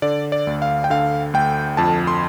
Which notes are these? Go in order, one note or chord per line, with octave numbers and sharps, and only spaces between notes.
D3 D5
D5
D2
F5
G5
D3 F5
D2 G5
F2 A5
C6